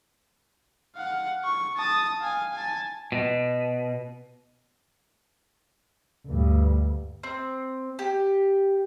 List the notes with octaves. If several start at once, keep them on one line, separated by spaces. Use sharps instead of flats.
F5 F#5
C#6
A5 D#6
F5 G#5
G#5 A5
B2
D2 G2
C4
G4